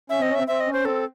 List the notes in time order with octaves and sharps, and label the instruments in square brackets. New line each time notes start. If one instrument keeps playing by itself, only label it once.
[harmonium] C#4 [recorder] E5
[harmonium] C4 [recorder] D#5
[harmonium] C#4
[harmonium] C4 [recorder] E5
[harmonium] C4 [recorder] E5
[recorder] D#5
[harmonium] C#4
[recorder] C5
[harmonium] C4 [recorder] A4